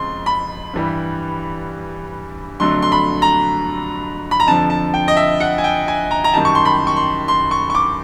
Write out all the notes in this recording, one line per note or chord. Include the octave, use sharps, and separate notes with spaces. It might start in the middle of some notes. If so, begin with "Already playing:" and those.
Already playing: F2 C#3 F3 G#3 C6
B5
G2 E3 G3
F2 D3 F#3 A3 C6
C6
B5
A#5
B5
A#5
F2 D3 F3 A5
A5
G5
D#5
E5
F#5
G#5
G5
G#5
A#5
A#5
F#2 D#3 G3 A5
C#6
C6
B5
C#6
C6
C6
C#6
C#6
D6